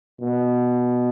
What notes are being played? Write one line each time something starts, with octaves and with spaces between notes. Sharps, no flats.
B2